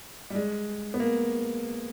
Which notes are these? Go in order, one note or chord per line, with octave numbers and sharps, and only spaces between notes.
G3
G#3
B3
A#3